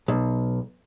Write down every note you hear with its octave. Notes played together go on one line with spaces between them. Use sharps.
B1